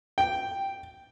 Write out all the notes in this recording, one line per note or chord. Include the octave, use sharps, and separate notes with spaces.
G5